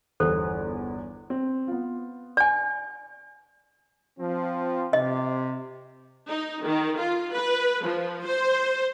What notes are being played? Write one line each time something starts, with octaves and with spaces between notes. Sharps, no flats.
G1 E2 A4 C5
C4
B3 F4
D5 G#5
F3 C4
C3 D#5
D#4
D#3
F4
B4
F3
C5